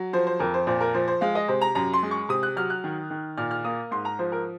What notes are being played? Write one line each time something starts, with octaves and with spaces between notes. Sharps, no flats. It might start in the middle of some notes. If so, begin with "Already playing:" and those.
Already playing: F#3
F3 C5
C5
F2 A#4
C5
A#2 C5
A#4
F3 C5
C5
G#3 F5
D#5
C3 C5
A#5
F#2 A#5
C6
G#3
C#6
C3 D#6
F#6
F#3 F6
F#6
D#3
D#3
A#2 F6
F6
A#3 D#6
G#2 C6
A#5
F3 C5
A#4